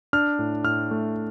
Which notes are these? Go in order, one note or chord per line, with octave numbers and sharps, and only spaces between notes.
D4 F6
A2
A2 F6
A3